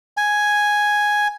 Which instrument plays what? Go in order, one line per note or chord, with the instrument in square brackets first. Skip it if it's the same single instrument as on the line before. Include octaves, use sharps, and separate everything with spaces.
[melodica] G#5